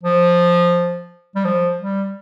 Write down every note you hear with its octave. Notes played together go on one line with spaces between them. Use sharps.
F3
G3
F3
G3